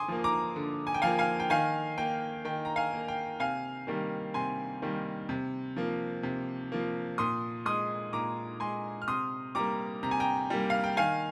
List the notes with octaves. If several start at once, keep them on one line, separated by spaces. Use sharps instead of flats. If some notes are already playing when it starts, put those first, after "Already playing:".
Already playing: D3 G#5 C6 D6 D#6
F3 A#3
A#5 D6
D3
G#5
G5
F3 A#3 F5 G#5
F5 G#5
G5
D#3 F5 G#5
A#3 G5
D#3 G5
A#5
F5 G#5
A#3
G5
C3 F5 G#5
D#3 G3 A#3
C3 G#5 C6
D#3 G3 A#3
C3
F3 A#3
C3
F3 A#3
A#2 C6 D#6
G#3 C6 D#6
A#2 A#5 D6
G#3 G#5 C6
F6
C3 C6 D#6
G3 A#3 A#5 D6
C3 A#5
G#5
G5 A#5
G3 A#3
F5
G5
D#3 F5 G#5